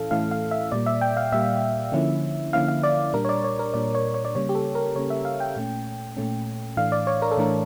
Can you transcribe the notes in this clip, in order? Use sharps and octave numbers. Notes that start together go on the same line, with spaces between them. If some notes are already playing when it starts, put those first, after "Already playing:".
Already playing: A2 E3 C#4 E4 A4 F5
A2 E3 A3 C#4 E4 F5
F5
E5
A#2 G3 A#3 D5
E5
G5
F5
A#2 G3 A#3 E5
D3 F3 A#3 C#4 E4
D3 F3 A#3 C#4 E4 F5
F5
D5
A#2 G3 D4 A#4
C#5
D5
C#5
A#4
A#2 G3 D4 D5
C#5
C#5
D5
C#3 G3 A#3 C#4 C#5
G4
A4
A#4
C#3 G3 A#3 C#4 C#5
E5
F5
G5
A#2 A3 C#4
A#2 A3 C#4
A2 E3 A3 D4 F5
D5
C#5
A#4
A4
A2 E3 A3 D4 A#4